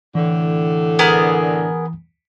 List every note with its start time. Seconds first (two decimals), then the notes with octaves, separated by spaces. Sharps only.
0.15 A2 D3 E3
0.99 B3 G#4 A#4